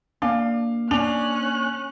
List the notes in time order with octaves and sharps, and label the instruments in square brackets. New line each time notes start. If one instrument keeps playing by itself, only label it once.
[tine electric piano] A#3 [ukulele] D4 [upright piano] F5
[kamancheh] C#4 F#6 [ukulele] D4 [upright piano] F7